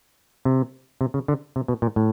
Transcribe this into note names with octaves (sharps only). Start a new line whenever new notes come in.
C3
C3
C#3
D3
C3
B2
A#2
A2